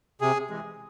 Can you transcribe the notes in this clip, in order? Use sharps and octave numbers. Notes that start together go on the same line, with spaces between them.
C3 G#4
E3 G#3